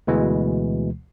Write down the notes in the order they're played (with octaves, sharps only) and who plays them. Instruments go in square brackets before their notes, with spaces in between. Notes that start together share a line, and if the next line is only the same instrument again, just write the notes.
[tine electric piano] D2 B2 E3 G#3